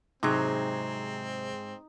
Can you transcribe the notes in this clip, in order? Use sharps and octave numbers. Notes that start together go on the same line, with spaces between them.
G#2 C3 F#3 C4 D#4 G#4